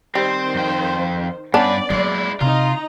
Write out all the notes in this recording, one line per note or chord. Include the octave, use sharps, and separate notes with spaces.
D#3 G3 C4 C5
F2 G5
G2 B3 C#4 D4 B4 D5
F#3 G#3 A#3 E4
C3 D#4 F4 D#5 A#5